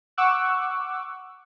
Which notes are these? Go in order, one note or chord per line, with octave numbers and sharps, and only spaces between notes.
F#5 C#6 D6 E6 F#6